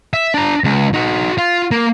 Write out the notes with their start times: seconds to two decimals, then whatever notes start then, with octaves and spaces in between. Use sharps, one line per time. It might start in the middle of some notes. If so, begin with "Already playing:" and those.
0.14 E5
0.34 D4 A#5
0.64 C#2
0.94 D#4 F#4
1.38 F4
1.71 A#3